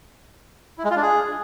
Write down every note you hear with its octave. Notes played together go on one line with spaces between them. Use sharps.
E4
G#3
F4
D4
G#4